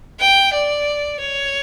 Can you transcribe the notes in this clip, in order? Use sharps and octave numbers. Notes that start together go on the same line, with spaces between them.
G5
D5
C#5